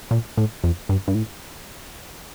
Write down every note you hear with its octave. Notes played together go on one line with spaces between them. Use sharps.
A#2
A2
F2
G2
G2
A2